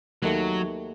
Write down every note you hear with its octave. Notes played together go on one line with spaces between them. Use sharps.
D#2 D#3 F#3 A3